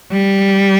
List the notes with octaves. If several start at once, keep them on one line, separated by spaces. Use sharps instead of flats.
G3